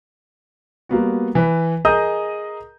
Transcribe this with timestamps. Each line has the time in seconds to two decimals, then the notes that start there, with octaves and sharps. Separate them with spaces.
0.89 G3 A#3 B3 F#4
1.35 E3 B4
1.85 G#4 A#4 D#5 A#5 D#6 G6